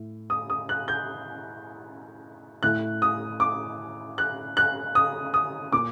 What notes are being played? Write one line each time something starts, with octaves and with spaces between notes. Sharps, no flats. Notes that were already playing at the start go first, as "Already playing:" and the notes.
Already playing: A2
D#6
D#6
F#6
G6
A2 F#6
D#6
D6
F#6
F#6
D#6
D#6
A#2 D6